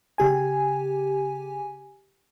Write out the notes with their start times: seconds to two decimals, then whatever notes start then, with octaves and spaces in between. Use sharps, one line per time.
0.18 C#3 G4 G#5